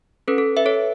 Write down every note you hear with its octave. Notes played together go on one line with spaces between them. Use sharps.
C#4 A4 B4
A4
B4 E5
A4 C#5